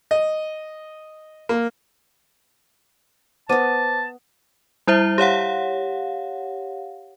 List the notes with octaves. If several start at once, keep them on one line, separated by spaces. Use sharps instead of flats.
D#5
A#3
B3 C5 D#5 A5 D6 D#7
G3 E4 C5 E5
G4 C#5 F5 F#5